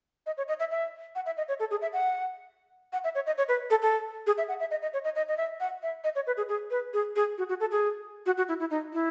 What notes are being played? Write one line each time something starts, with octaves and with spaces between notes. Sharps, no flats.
D#5
C#5
D#5
E5
E5
F#5
E5
D#5
C#5
A4
G#4
E5
F#5
F#5
E5
C#5
D#5
C#5
B4
A4
A4
G#4
E5
F#5
E5
D#5
D#5
C#5
D#5
D#5
D#5
E5
F#5
E5
D#5
C#5
B4
G#4
G#4
B4
G#4
G#4
F#4
F#4
A4
G#4
F#4
F#4
E4
E4
D#4
E4